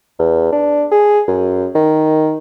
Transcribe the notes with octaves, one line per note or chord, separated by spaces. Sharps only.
E2
D4
G#4
F#2
D#3